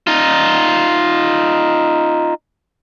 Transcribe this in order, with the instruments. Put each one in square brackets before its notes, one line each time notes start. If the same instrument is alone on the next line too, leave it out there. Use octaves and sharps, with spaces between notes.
[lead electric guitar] D#4 F4